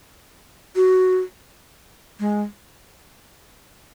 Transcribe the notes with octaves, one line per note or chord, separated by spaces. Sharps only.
F#4
G#3